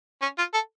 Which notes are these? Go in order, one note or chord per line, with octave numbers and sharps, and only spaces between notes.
C#4
F4
A4